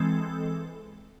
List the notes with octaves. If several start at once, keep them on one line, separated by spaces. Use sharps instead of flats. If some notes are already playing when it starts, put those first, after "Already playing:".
Already playing: E3 G#3 C4 A4